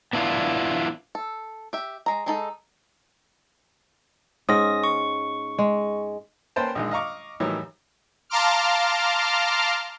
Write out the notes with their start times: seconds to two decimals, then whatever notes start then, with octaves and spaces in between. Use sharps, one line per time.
0.13 B3 D4 E4 F4
1.15 A4
1.73 G4 E5
2.06 G#3 A#5
2.26 G#3 D#4 A4
4.49 G#2 C#4 D#6 A#6
4.84 C#6
5.59 G#3
6.56 A#3 C#4 B4 C5 G5 A5
6.75 A#1 D#3 G#3
6.91 D#5 F5 A#5 C#6 D6
7.40 A2 D#3 E3 F#3 G3 C#5
8.30 F5 A5 A#5 C6 D6 F6